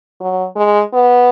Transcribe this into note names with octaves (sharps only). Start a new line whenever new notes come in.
F#3
G#3
B3